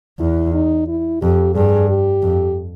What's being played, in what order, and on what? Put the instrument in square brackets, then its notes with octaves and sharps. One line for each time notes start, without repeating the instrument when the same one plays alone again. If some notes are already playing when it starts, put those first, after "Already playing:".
[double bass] E2 [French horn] E4
[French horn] D#4
E4
[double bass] F2 [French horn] G4
[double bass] G2 [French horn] G#4
[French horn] G4
[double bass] F2